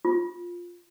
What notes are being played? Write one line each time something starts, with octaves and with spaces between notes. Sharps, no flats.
F4